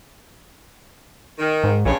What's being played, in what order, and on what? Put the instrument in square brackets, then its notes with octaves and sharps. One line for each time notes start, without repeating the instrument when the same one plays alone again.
[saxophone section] D#3
[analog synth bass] G#2
[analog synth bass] A#1 [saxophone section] G2 C#3 C#5